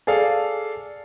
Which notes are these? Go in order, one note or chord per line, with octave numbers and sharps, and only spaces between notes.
G#4 A4 D5 F5